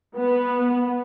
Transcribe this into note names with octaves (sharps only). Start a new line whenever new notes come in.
B3